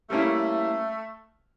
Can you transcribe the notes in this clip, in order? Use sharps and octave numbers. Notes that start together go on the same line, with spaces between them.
G3 A3 A#3 C#4 E4